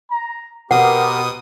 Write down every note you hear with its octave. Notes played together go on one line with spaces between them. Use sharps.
A#5
B2 B3 C4 G4 A#4 F#5 D#6